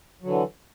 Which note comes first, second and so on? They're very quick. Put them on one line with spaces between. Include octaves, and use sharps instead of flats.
F#3 D3 E3